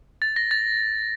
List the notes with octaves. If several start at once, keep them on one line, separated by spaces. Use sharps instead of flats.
A6
A#6
A6